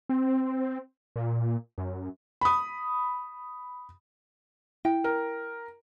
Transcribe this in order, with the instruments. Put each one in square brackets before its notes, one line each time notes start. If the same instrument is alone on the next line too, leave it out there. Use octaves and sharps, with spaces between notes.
[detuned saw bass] C4
A#2
F#2
[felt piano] B5 D#6
[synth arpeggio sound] E4 [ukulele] G5
[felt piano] A#4